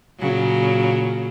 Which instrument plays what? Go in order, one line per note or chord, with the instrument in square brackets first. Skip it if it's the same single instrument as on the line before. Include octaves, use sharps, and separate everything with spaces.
[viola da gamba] A#2 C#3 F#3